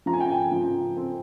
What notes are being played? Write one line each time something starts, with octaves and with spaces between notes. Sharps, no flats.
F3 A#5
G#5
G5
G#5
F3
C4